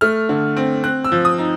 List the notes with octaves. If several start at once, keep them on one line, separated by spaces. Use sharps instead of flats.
A3 F6
D3
C4
C4 F#6
E6
F3
D#6
D#4